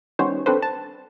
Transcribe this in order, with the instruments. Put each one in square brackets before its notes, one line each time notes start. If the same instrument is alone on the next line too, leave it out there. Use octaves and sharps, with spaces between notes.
[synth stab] D#3 G3 B3 C#4 C5 C#5
C4 D4 A4 B4 C5
A5